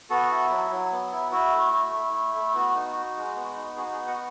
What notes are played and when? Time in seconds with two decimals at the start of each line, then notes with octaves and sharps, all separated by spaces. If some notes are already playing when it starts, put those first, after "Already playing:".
0.10 B3 F#4 A4
0.31 E4
0.51 F#3
0.71 F#3
0.92 B3
1.12 E4
1.32 E4 F#4
1.53 A3
1.73 E4
1.93 A3
2.13 E4
2.34 A3
2.54 B3 F#4
2.75 D#4
2.96 F#4
3.16 G#3
3.36 B3
3.56 D#4
3.76 F#4 G#4
3.92 G#4
3.97 B3
4.07 D#5 F#5